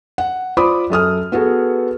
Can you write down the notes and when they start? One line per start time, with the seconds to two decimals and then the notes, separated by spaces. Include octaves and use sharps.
0.18 F#5
0.57 F4 C5 D5 B5 D6 D#6
0.90 F#2 A4 D#6 F6
1.32 B3 F#4 G#4 A4 B4